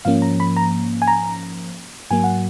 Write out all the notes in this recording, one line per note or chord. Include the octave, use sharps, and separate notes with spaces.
G#2 F3 A#3 C#4 F5
A#5
B5
A#5
G#5
A#5
G#2 F#3 A#3 G#5
F#5